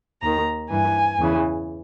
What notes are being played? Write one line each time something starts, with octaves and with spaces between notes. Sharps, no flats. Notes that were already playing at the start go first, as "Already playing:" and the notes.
D#2 D#3 A#5
G2 E3 G#5
E2 C#3 E3